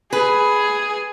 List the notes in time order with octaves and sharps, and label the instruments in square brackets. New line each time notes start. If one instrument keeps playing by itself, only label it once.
[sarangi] G#4 [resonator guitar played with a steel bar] B4